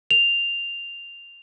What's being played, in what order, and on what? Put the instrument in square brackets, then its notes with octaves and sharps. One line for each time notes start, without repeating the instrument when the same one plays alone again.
[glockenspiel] F7